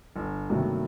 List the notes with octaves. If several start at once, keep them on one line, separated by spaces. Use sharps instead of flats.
G1
G2 C3 D#3 F#3 A3 A#3